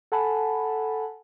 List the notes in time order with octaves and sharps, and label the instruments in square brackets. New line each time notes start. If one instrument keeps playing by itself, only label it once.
[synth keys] A4 F#5 G#5 A5 B5